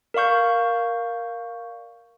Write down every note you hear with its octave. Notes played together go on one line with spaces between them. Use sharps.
A#4 D5 F5 C#6 G6